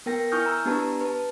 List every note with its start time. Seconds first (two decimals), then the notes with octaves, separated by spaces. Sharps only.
0.06 B3 A#4 G5 A#6
0.32 E4 G#5 C#6 D#6 F6 G6
0.46 A#5 E6
0.65 B3 D4 G4 B4 A5 A#5
1.01 B4 A5